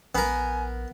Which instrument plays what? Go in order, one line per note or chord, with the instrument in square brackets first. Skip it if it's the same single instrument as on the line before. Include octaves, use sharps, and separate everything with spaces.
[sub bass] A#1 [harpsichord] B3 A#4 [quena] G#5